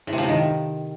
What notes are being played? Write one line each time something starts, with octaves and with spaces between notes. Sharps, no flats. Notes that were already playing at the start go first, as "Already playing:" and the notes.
A2
C3
F3
C3
D#3